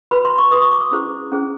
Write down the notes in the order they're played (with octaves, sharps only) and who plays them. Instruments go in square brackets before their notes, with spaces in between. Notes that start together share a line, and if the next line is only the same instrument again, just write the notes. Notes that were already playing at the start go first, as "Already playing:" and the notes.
[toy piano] F#4 B4 B5
C6
C#6
F#4 B4 D#6
C#6
D6
D#6
C#4 E4 G#4 C5
C#4 E4 G#4 C5